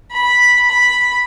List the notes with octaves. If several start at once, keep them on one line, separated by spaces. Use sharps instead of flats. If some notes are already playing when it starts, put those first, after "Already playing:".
B5
B5